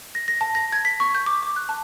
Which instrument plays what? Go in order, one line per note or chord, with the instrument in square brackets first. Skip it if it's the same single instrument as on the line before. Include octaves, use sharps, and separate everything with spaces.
[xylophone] A#6
A#6
A5
A#6
G#6
B6
C#6
G6
D6
D6
F#6
A5